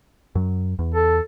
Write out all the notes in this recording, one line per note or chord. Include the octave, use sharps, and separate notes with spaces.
F#2 F#3
E2
A4